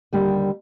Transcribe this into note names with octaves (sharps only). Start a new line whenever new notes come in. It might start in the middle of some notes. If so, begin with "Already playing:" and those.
D#2 D3 G3 A#3